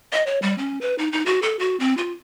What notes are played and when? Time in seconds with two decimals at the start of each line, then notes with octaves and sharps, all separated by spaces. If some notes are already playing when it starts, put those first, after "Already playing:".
0.13 D#5
0.27 C#5
0.42 G3
0.58 C#4
0.81 B4
0.98 D#4
1.12 D#4
1.26 F#4
1.42 A4
1.59 F#4
1.80 C4
1.98 F4